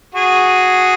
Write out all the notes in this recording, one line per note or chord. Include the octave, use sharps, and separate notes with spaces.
F#4 G#4